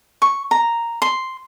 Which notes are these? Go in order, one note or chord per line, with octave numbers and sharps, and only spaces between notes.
C#6
A#5
C6